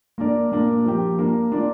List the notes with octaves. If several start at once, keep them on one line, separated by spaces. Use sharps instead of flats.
A#3 D4 A#4 D5
A#2 A#3 D4 A#4
F3 A#3 G4
A#3 D4 A#4
A#3 D4 F4 D5